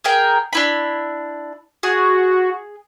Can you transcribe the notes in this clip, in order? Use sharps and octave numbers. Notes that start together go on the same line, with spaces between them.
G#4 A#4 G5
D4 E4 B5
F#4 G#4